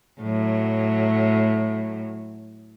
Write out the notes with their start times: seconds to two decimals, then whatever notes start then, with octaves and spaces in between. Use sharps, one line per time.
0.21 A2 F#3